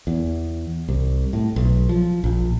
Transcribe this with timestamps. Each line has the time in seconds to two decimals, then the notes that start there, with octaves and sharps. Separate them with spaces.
0.07 E2
0.89 C2
1.33 A2
1.56 B1
1.89 F3
2.24 A#1